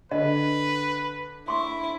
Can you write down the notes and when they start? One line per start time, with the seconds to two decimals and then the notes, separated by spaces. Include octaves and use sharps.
0.11 D3 B4 D#5
1.48 E4 C6 C#6